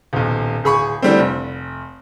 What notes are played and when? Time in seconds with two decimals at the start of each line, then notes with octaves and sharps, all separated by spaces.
0.13 D#1 B1
0.64 D1 G#4 B5 C#6
1.02 D3 E3 G3 A3 C4
1.19 F1